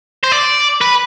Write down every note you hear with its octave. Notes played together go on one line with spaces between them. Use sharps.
C5
D5
B4